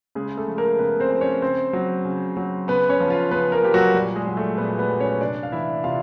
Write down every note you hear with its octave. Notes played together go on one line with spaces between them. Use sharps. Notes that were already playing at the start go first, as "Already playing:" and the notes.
C#3 G#3 G#4
A3 A4
F3
A#3 A#4
C#3 B3 B4
C4 C5
F3
C#4 C#5
C#3 C4 C5
F#3
C#3
F#3
C#3 B3 B4
C#4 C#5
F3
F4 F5
C#3 B3 B4
A#3 A#4
F3 G4
F#3 F#4
A#2 G3 G4
G#3 G#4
F#3
A3 A4
A#2 B3 B4
B3 B4
F#3
C#4 C#5
C3 D4 D5
F5
E3 E4 E5
C3 F4 F5